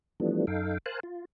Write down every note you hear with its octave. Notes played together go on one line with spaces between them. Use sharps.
E3 F3 G3 A3 B3 D4
F#2 D#4 A4 F5 G5
A#4 C5 F5 G#5 A5 F#6
F4